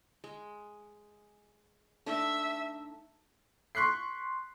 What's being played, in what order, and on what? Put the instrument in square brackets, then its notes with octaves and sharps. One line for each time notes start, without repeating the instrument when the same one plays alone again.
[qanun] G#3
[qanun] A3 D4 D#4 [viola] E5
[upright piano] C6 C#6 F#6 B6 C7